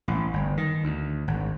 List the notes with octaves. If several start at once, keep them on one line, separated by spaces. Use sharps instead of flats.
A1
G1
D#3
D2
G#1